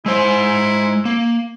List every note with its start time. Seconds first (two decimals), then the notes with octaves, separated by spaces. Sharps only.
0.06 G#3 E4 C5
1.05 A#3